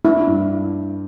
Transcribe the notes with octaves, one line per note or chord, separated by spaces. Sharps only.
D4 E4
G2